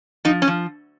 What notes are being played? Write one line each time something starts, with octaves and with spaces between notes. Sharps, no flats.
F3 D#4
C#4
F3